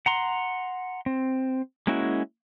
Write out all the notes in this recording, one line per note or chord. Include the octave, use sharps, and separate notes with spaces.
F#5 A#5 C6
C4
G#3 A#3 C#4 E4 F#4